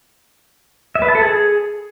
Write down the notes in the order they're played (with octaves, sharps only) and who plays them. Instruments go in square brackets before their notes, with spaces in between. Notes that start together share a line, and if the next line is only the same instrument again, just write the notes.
[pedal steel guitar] E5
B4
A5
A4
G#4